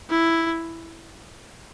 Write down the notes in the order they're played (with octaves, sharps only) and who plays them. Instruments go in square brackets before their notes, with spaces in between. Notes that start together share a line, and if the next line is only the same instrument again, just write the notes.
[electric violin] E4